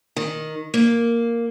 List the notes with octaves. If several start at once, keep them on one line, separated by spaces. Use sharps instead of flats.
D#3
A#3